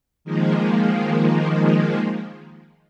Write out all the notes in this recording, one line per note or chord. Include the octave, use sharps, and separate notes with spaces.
D#3 F3 G#3 A#3